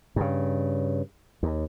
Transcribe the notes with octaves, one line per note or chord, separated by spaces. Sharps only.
G2 C#3
D#2